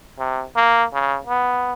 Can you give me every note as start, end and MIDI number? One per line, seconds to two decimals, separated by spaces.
0.19 0.43 48
0.56 0.84 58
0.93 1.18 49
1.27 1.73 59